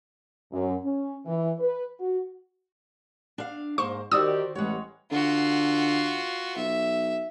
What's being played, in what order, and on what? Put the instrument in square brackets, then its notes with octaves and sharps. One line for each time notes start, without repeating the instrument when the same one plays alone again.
[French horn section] F#2
C#4
E3
B4
F#4
[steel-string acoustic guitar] D4 F5
[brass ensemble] G#2 [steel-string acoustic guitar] A#3 C5 [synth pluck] C#6
[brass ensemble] D#3 G4 [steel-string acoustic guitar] F#4 C5 D5 [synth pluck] D#6 E6
[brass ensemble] A1 G3 F#5 [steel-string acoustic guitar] G#3 C#5
[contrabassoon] D3 [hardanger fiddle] F4 F#4
[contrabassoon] B1 [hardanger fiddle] E5